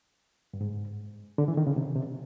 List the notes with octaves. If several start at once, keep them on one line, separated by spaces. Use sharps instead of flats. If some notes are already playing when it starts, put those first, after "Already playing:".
G2
G#2
D3
E3
D#3
C#3
C3
C3